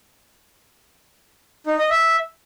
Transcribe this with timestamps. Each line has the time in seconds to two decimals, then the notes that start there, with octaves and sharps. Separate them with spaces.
1.67 D#4
1.79 D#5
1.90 E5